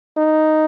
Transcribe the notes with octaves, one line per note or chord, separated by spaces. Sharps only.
D#4